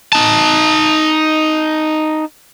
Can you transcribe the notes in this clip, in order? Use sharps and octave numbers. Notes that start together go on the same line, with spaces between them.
D#4 A5